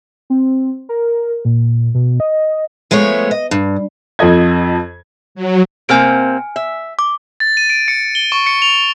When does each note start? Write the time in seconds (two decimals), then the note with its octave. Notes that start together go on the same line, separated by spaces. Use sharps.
0.30 C4
0.89 A#4
1.45 A#2
1.95 B2
2.20 D#5
2.91 F3 G#3 A3 B3 C#5
3.31 D#5
3.51 G2
4.19 F2 F3 A4 D#5 G#6
5.35 F#3
5.89 C3 A#3 C4 G#5 F6 D7
6.56 E5
6.99 D6
7.40 A6
7.57 D#7
7.70 D7
7.88 C#7
8.15 G7
8.32 C#6
8.46 C#7
8.62 F7